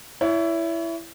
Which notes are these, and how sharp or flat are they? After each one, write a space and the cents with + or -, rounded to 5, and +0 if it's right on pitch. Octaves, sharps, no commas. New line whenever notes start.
E4 +10 C#5 +35